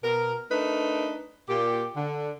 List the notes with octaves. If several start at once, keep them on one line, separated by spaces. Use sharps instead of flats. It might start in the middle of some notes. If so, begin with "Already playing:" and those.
B2 A#4
A3 D4 D#4 A#4 B4
A#2 G4
D3